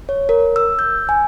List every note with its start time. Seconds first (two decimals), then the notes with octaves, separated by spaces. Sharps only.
0.09 C#5
0.29 A#4
0.56 E6
0.79 G6
1.09 G#5